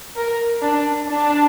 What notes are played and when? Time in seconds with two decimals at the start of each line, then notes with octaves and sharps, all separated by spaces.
0.17 A#4
0.62 D4
1.09 D4